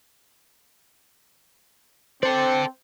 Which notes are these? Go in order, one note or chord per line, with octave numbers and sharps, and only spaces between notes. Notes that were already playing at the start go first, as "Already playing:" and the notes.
C4 A4 C5 D5